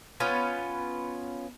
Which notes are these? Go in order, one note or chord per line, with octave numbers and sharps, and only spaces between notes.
B3 C#4 F4 B4